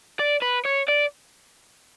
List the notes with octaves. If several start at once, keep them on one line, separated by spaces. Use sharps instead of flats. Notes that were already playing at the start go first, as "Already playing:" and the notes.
D5
B4
C#5
D5